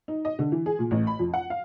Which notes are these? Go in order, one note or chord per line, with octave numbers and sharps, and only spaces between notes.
D#4
D#5
D3
E3
G#4
A#2
A1
B5
F2
F#5
F5